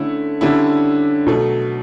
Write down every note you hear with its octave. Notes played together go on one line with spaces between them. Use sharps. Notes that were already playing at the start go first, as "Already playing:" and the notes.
Already playing: D3 A3 C#4 E4
D3 G3 C#4 E4
B2 F#3 A3